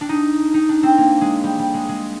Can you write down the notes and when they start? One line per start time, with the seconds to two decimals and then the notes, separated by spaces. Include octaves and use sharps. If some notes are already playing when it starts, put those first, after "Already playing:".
0.01 D4
0.09 D#4
0.54 D#4
0.69 D4
0.83 C4
0.98 A#3
1.21 G#3
1.44 G3
1.59 G3
1.74 G#3
1.89 G#3